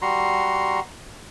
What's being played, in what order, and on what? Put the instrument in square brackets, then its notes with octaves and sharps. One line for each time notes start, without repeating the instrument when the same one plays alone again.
[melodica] G3 F#4 A#5 C6